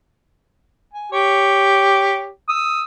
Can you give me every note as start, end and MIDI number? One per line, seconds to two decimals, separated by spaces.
0.94 1.08 80
1.12 2.29 67
1.12 2.29 73
2.49 2.83 87
2.49 2.83 88